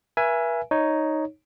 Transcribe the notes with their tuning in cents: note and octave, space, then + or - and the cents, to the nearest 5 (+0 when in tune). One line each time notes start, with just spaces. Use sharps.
B4 -40 E5 +25 G#5 +0
D#4 +0 C#5 +0